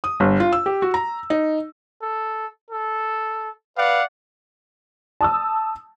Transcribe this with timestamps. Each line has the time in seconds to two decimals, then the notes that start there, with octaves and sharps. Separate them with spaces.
0.04 D#6
0.20 G1
0.40 F4
0.53 E6
0.66 G4
0.82 F#4
0.94 A#5
1.30 D#4
2.02 A4
2.71 A4
3.77 B4 D5 F5 F#5
5.21 A5 D#6 E6